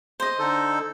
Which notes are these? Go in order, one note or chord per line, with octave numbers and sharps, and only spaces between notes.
C5 D#5
D3 D#4 A4